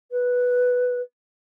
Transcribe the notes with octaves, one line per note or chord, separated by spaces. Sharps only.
B4